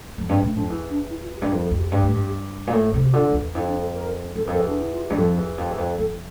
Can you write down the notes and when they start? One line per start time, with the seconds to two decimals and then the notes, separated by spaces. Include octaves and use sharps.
0.18 F2
0.29 G2 C4
0.42 A2 D4
0.55 F2 D4
0.70 E2 E4
0.90 D4
1.10 E4
1.23 F4
1.37 G4
1.42 G2
1.51 F2 A#4
1.65 A4
1.71 F2
1.78 G4
1.92 G2 G4
2.03 A2
2.14 G2
2.67 A#2
2.73 A2
2.94 C3
3.05 G4
3.13 D3 F4
3.30 F2
3.34 E2
3.54 F2 E4
3.67 D4
3.82 A4
3.95 A#4
4.35 E2 A4
4.45 F2 A#4
4.54 E2 A4
4.68 D4
4.80 E4
4.92 F4
5.05 G4
5.10 G2
5.17 F2 A4
5.37 E2
5.58 F2 G4
5.71 E2
5.78 F2
5.98 F2 A4